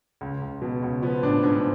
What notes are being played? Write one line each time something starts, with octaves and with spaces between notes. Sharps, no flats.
C#2
C#2
B2
C#2
F3 B3
A1 D4
G#2 D4